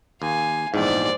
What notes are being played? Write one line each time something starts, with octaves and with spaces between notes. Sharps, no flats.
D#2 F5 G#5
A#1 E2 G#2 C5 D5